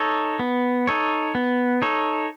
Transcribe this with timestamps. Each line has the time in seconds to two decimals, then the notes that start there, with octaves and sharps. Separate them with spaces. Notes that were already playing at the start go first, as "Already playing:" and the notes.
Already playing: D#4 A4 C#5
0.39 B3
0.87 D#4 A4 C#5
1.35 B3
1.82 D#4 A4 C#5